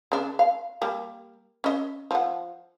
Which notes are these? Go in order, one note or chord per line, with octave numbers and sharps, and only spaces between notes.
C#3 D4
F5
G3 A#3
C#4 D#5
F3 F#5